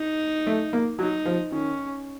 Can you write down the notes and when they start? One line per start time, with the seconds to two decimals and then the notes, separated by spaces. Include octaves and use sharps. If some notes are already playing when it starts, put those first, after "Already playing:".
Already playing: D#4
0.47 A3
0.73 A#3
0.99 F#3 D#4
1.26 F3
1.52 D#3 C#4